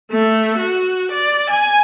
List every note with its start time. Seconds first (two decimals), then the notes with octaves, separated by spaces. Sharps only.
0.11 A3
0.57 F#4
1.11 D5
1.50 G#5